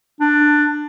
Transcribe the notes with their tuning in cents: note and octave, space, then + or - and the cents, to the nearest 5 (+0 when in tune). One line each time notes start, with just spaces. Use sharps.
D4 +15